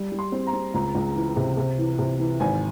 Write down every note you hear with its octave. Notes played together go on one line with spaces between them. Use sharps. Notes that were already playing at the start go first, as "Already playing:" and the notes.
Already playing: G3
G3
C6
C4
A#5
C4
C#2 A#5
C#2
E3
C3
C3
E3
C3
E3
G#1 G#5